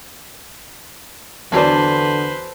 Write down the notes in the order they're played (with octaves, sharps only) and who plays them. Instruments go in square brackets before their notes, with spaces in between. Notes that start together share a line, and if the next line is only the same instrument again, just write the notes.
[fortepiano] E2 F#3 D4 [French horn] D3 [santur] A4 [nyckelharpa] B4 C5